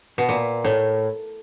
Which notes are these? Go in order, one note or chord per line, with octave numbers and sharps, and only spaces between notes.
B2
A#2
A2